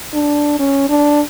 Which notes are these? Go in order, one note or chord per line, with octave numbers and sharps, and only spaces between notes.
D4
C#4
D4